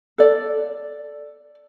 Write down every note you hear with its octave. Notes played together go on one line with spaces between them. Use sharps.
A4 D5